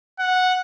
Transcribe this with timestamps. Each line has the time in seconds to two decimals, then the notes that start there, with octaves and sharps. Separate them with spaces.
0.19 F#5